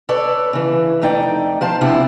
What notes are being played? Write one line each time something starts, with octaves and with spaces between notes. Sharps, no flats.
A4 B4 C#5 D5
C#3 E3
F2 A3 D#4 D5 G5
F3 C5 F5 A5
C3 B3 C4 D4 E4 F4